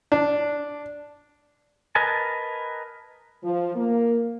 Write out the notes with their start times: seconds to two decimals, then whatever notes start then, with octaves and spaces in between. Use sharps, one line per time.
0.12 D4
1.95 A#4 B4 D#5 G#5 A5
3.43 F3
3.75 A#3